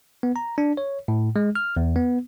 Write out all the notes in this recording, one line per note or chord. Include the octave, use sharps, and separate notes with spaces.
B3
A#5
D4
C#5
A2
G#3
F6
E2
B3